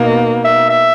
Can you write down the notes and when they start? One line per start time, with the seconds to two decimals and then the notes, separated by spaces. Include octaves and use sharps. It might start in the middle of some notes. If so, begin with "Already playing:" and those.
Already playing: B2 A#3 D#4
0.44 E5
0.69 E5